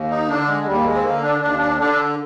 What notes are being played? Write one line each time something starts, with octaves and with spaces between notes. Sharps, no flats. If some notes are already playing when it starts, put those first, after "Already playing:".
Already playing: D#2
D#4
D3 D4
G#3
D#2 G3
A#3
G#3
C4
D3 A#3
D4
D#2 D4
D4
D3 D4